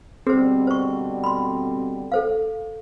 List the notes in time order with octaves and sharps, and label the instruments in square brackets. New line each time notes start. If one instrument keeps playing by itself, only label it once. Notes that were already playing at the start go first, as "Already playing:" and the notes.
[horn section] B2 D3 G3 [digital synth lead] C4 [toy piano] G#4 C5
[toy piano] C5 C#6
B5 C6
A4 C5 F5